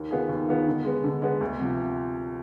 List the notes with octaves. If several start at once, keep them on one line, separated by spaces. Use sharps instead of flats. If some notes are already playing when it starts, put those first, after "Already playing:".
Already playing: D#2
D#3 B3 F4 G#4
D#2
D#3 B3 F4 G#4
D3
G#3 B3
D3
G#3 B3
D2
C3 F3